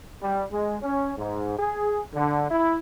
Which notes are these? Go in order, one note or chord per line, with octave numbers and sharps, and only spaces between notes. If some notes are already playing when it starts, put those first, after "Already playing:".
G3
G#3
C#4
G#2
G#4
D3
E4